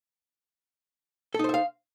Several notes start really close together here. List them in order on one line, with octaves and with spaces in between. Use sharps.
A4 D#4 C5 E5 F5